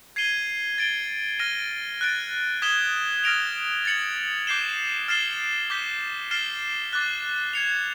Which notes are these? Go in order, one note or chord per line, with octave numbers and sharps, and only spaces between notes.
G#6 C7 D#7 G7
A6 D7 G7
F6 A#6 D#7 G7
F#6 A6 D7
D#6 G#6 B6 E7 G7
F6 A#6 D7 F7
A6 C#7 F#7
D6 G6 C7 E7 G7
F6 A6 C7 E7 G7
D6 G6 B6
F6 A6 C7 E7 G7
D6 F#6 A6
G#6 C#7 F7